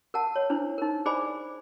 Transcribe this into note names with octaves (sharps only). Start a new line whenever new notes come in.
A#4 F#5 A5
C#5
D4 E4 C5
D#4 A#4
G#4 C5 D5 G#5 B5